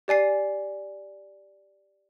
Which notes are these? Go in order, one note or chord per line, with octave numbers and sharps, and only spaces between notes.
G4 D5 G#5 C7